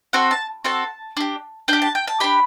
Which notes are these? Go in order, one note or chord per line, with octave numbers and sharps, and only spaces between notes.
C4 F#4 A4 F#5
A5
C4 F#4 A4 A5
D4 G4
D4 G4 G5
A5
G5
A5
D4 G4 B5